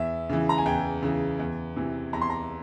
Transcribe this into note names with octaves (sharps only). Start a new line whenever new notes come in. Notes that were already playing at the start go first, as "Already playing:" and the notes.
Already playing: E2 E5
C#3 E3
A#5
G#5
E2 G5
C#3 E3
E2
C3 E3
E2 A#5
C6
A#5